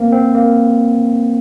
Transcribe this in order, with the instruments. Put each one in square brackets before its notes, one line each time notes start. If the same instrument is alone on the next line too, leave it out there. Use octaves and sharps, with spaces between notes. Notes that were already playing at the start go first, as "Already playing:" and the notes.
Already playing: [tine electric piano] A#3 C4
C4
A#3